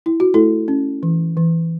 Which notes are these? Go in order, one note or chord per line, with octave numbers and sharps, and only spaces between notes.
E4
F#4
A3 E4 A4
C#4
E3
E3